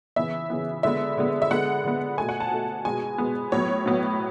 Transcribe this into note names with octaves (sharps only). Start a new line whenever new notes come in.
C#3 E3 B3 E5
C#3 E3 B3
D3 G#3 B3 E5
D3 G#3 B3
E5
D3 G#3 B3 F#5
D3 G#3 B3
B2 A3 G#5
F#5
A5
B2 A3
B2 G#3 B3 G#5
B2 G#3 B3
A2 F#3 B3 C#5
A2 F#3 B3